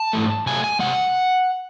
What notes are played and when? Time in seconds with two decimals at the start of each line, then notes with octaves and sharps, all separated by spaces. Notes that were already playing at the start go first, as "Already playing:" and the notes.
Already playing: A5
0.13 G#2 E3 A3
0.46 C3 F#3 A3 G#5
0.64 G#5
0.79 C3 D#3 G#3 F#5